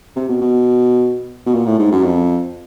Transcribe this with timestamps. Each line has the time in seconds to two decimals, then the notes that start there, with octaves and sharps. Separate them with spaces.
0.16 C3
0.29 B2
0.41 B2
1.46 B2
1.55 A#2
1.67 A2
1.79 G#2
1.92 F#2
2.04 F2